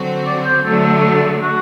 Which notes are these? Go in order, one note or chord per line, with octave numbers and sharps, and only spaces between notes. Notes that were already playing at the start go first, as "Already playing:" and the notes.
Already playing: D3 F#3 C4 F#4
D5
C5
D3 F#3 A3 A4
F#4